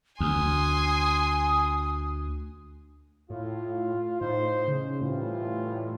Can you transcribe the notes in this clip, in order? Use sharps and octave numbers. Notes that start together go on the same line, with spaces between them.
D2 G#5 C6 D#6
A2 F4
A2 D#4 C5
C#3
A2 E3 G3 F4